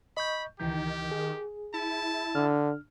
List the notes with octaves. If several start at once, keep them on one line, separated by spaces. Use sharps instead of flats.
D#5 B5 C#6 G6
C#2 D#3 E3 G4 G6
G#4
E4 A5
D3 D4 F6